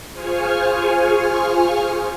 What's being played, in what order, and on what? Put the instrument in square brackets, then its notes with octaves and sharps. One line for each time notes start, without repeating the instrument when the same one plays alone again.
[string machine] F4 G#4 C5 G#5 C#6 F6